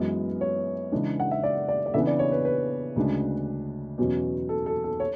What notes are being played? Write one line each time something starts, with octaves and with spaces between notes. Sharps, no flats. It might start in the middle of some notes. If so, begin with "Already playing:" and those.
Already playing: F#2 E3 G#3 B3
C#5
C#3 E3 G#3 D4
F#5
E5
D5
D5
D5
C#3 E3 B3 D4 E5
D5
C#5
B4
B4
D2 C#3 G#3 D4
E2 B2 F#3 C#4
A4
A4
A4
C#5